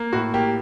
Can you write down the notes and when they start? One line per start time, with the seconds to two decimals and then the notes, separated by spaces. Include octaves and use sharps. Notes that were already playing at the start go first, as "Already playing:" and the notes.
Already playing: A#3
0.13 A2 F#4
0.34 A#3 G4